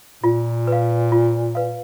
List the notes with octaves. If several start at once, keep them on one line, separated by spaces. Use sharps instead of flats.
A#2 F4
B4 F5
F4
B4 F5